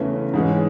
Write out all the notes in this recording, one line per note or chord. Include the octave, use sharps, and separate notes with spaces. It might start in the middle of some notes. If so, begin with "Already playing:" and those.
Already playing: E2 C#3 E3 A3 C#4
G#2 E3 G#3 C#4